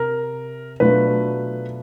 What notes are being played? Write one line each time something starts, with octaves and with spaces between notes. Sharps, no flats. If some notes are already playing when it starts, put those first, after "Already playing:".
Already playing: C3 A#4
B2 F#3 A3 D4 F4 B4